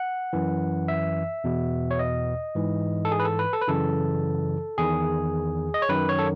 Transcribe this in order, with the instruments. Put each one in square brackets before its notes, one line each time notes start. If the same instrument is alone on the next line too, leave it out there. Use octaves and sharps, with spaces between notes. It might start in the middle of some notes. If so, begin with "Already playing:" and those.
Already playing: [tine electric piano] F#5
F#2 E3
E5
E2 B2
C#5
D#5
G#2 E3
A4
G#4
B4
A4
B4
A4
B4
F#2 C#3 E3 A4
E2 D#3 G#4
D#5
C#5
F#2 D#3 B4
C#5
A4